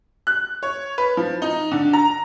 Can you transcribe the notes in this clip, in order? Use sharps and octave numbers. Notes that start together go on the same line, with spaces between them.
F#6
C#5
B4
F3
D#4
D3
A#5